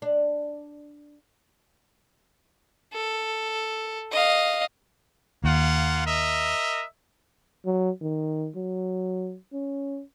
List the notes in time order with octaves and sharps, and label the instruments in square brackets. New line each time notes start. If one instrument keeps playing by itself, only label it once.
[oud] D4
[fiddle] A4
D#5 F5
[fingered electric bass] D#2 [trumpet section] A#3 F4 F#5
[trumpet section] A#4 D#5 E5
[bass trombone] F#3
D#3
F#3
C#4